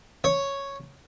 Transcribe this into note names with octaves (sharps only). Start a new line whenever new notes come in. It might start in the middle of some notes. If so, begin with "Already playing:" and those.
C#5